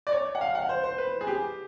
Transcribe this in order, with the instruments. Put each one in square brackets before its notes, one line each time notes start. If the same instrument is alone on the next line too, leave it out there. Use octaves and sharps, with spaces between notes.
[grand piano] D5
C#5
F#5
F5
F#5
C5
C5
B4
G#4
G4